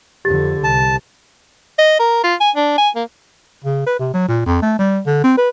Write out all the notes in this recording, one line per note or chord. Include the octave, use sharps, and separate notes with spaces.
F2 D3 G4 A6
C2 A5
D#5
A#4
F4
G#5
D4
G#5
A#3
C#3
B4
C3
F#3
A#2
F2
A3
G3
D3
C4
B4